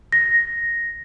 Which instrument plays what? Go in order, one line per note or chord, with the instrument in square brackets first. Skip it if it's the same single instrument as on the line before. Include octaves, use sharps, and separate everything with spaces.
[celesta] A#6